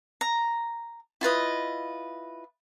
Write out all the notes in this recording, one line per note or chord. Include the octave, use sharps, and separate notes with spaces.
A#5
E4 F4 B4 D#5